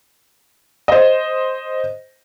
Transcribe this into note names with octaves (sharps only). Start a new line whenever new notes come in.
C5 D#5